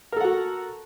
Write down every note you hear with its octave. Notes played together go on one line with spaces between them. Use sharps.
F#4 A4 A#4 F#5